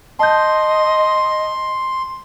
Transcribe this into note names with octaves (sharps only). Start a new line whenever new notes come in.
D#5 A5 C6 G6